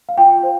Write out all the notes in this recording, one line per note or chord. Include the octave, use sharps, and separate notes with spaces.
F5
F4 G5
C5